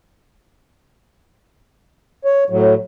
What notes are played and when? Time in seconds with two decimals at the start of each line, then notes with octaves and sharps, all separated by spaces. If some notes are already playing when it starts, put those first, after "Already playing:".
2.25 C#5
2.50 A2 F#3